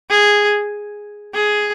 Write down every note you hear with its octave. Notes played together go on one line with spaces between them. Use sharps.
G#4
G#4